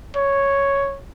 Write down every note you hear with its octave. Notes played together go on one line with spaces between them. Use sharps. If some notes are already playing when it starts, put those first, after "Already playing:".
C#5